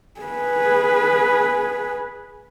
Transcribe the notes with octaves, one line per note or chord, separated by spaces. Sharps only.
G#4 B4